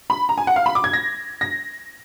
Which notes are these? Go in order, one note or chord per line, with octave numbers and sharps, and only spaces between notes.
B5
A#5
G#5
F#5
F5
B5
D6
G#6
A#6
A#6